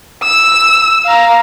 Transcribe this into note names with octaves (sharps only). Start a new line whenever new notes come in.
E6
F5 A#5